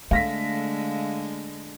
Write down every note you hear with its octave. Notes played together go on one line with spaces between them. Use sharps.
D3 G#3 A3 F5 A#6 B6